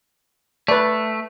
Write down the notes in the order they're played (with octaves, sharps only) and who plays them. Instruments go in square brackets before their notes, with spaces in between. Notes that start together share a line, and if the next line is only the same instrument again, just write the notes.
[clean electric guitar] A3 [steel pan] B4 D5